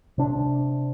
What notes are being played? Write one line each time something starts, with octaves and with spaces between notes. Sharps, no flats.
C3 D4